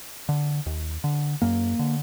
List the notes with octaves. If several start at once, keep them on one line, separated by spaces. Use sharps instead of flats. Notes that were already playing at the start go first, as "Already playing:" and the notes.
D3
D#2
D3
F#2 A#3
D3